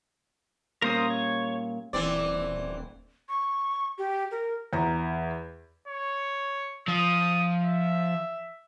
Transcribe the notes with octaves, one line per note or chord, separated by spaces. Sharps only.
A#2 G3 C#4 A#4 C5 D#6
C#5
D#1 E3 C4 D5
C#6
G4
A#4
E2 A#5
C#5
F3 D#6
E5